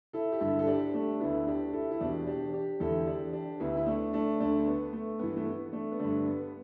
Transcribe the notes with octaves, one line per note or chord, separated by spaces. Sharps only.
E4 A4
G4
G2 D3 E4 A4
A4
D4 G4
A3 D4
D2 D3 B3 E4
D4 G4
E4 A4
E4
E2 B2 D4 G4
D4 G4
D4 G4
E2 D3 E4 A4
D4 G4
D4 G4
D2 D3 B3 E4
E4
A3 D4
A3 D4
D2 D3 A3 D4
A3
B3
A3
G2 E3 B3
A3
B3
A3 D4
B3
G2 D3 A3 D4
B3